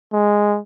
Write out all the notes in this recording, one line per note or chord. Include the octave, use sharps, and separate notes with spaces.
G#3